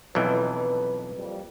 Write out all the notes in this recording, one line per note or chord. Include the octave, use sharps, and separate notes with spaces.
B1 F2 E3 B4
F2 A#2 G3